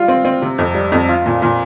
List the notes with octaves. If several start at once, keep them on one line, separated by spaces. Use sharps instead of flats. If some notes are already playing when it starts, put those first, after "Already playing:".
Already playing: G3 F4
C4
C4
C3
F2
G3
F2
F4
A#2
A#2